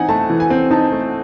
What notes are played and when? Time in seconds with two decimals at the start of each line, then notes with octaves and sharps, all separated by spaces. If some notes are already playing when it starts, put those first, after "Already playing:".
Already playing: E3 C4 D#4 F#5 G#5
0.09 A3 A5
0.30 E3
0.40 G#5
0.50 C4
0.71 D#4 A5
0.92 A3